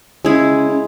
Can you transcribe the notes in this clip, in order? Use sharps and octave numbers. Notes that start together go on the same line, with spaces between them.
C#3 G#3 E4 G#4
C#3